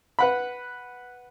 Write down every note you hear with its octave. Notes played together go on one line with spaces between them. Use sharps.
B4 F#5 B5